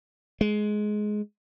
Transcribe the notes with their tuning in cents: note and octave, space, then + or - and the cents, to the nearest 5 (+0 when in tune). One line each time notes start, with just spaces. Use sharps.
G#3 +15